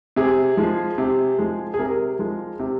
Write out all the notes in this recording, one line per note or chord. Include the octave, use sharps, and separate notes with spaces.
C3 G#4
F3 G#3
C3
F3 G#3
G#4
C3 A#4
F3 G#3
C3